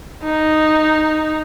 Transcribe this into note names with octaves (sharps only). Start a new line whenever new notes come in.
D#4